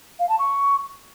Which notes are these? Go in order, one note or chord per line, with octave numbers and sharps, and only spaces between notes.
F5
A5
C#6